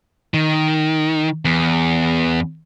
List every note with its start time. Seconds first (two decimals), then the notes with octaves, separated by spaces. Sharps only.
0.34 D#3
1.45 E2